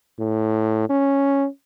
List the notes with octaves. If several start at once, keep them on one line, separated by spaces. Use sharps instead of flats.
A2
C#4